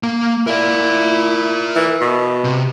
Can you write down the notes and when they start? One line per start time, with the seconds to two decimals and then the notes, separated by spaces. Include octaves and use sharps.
0.03 A#3 F5
0.47 E4 A#4 D5
1.76 E3
2.01 B2
2.44 C3